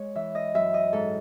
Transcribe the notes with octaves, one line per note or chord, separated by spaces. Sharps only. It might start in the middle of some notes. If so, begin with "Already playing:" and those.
Already playing: G#3 C#5
E3 E5
D#5
F#2 E5
D#5
G#2 A4